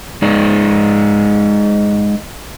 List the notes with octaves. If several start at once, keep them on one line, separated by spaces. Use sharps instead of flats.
G#3 D#4 G#4 D5